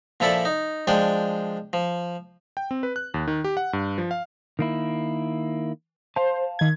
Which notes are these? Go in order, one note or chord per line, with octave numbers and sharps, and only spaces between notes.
A#2 F3 E4 A4 D5 B5
D#4
F3 G#3 D4 D5 G5
F3
G5
C4
B4
F#6
D#2
D#3
G4
F#5
G2
F3
F5
D#3 A#3 E4
C5 F5 A5
D#3 G#6